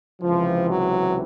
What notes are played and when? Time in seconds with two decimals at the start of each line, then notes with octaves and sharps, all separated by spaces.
0.22 C#2 C3 E3 F3
0.69 F#3